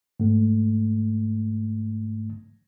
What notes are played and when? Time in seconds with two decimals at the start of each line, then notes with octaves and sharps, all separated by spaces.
0.20 G#2 A3